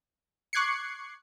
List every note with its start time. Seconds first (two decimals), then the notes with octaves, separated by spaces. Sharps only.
0.53 C#6 D6 F#6 G#6 C7 C#7